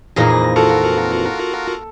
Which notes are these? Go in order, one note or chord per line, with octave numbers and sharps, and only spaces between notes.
F2 A#2 E3 A#3 D#4 G#4 A#6
F4 F#4 A4 A#4